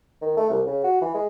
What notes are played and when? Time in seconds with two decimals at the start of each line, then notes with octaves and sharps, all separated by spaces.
0.21 D#3
0.37 A3
0.50 C2
0.66 C#3
0.84 F#4
1.01 E3
1.14 G#3